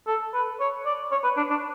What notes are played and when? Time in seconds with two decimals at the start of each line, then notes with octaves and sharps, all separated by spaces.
0.07 A4
0.34 B4
0.60 C#5
0.86 D5
1.12 C#5
1.24 B4
1.37 D4
1.50 D4